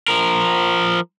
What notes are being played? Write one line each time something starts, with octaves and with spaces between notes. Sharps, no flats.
F3 A#4